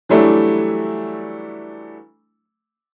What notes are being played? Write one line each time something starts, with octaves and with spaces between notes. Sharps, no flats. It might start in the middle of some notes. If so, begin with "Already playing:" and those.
E3 F#3 G3 A3 D4 E4